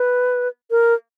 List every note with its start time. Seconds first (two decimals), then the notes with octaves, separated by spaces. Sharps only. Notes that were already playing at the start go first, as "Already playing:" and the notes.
Already playing: B4
0.71 A#4